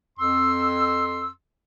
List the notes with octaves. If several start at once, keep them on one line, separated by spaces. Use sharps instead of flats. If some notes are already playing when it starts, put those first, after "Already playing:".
F2 C6 E6